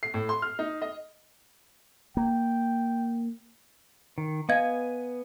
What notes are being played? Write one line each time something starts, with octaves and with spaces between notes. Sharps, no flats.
C7
A2
C6
F6
D#4
D#5
A#3 G5
D#3
B3 D#5 F5 G#5 G#6